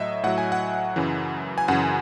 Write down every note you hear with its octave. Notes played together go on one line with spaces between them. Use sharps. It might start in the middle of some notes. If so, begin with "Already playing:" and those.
Already playing: A2 F#3 D#5 E5
A2 F#3 F#5
G#5
F#5
F#2 C#3 E3
G#5
F#2 C#3 E3 F#5